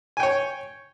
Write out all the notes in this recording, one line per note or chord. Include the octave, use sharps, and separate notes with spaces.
C#5 G5 G#5